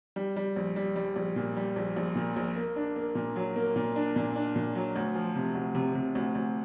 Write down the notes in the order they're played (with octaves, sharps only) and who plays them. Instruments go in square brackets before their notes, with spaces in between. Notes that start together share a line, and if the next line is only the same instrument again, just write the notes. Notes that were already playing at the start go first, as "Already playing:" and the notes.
[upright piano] G3
G3
A#1
G3
G3
A#1
A#2
G3
A#1
A#1
A#2
A#1
A#3
D4
A#3
A#2
F#3
A#3
A#2
D4
A#2
D4
A#2
F#3
D2
F3
C3
D2
C3
C3
D2
D2